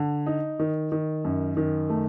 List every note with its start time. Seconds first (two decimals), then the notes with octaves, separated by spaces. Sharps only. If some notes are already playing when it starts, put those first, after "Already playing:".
Already playing: D3
0.26 D#4
0.59 D#3
0.92 D#3
1.25 F#2
1.57 D#3
1.89 A3